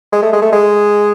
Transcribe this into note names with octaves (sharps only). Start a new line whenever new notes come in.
G#3
A3
G#3
A3
G#3